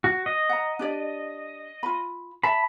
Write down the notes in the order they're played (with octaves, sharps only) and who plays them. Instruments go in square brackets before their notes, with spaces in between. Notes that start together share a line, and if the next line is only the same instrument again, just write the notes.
[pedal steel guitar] F#4
D#5
[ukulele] F#5 A#5
D4 G4 D5
F4 B5
[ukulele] E5 A5 [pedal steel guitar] B5